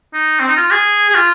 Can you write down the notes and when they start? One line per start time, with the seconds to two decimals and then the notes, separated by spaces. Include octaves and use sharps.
0.14 D#4
0.40 C4
0.48 D#4
0.57 F4
0.71 G#4
1.10 G#4
1.15 F4